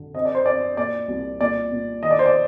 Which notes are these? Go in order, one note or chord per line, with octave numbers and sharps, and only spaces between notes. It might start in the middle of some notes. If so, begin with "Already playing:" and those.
Already playing: D3
C4 D#5
D5
C5
C4 D5
A#2 D5
C2
A#2 D5
A#2
D#3 D#5
D5
C5
D5